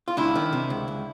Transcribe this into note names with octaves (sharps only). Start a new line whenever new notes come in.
F4
C#2 D4 E4
D#3
C3
C#2
C#2